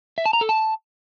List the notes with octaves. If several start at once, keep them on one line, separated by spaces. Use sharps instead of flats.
E5
A5
A#5
A4
A5